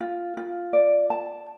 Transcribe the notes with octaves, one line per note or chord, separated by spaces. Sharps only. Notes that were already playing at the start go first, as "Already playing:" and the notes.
F4
F4
D5
A5